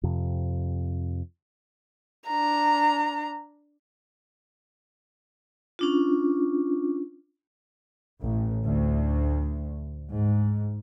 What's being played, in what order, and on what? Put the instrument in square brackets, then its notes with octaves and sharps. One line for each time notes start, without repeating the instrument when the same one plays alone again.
[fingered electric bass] F2 C3
[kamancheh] D4 A#5
[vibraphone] C#4 D4 F4
[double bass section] A1
D2
G#2